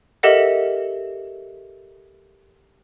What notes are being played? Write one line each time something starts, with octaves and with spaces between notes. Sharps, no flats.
G4 A4 A#4 D#5 E5 F#5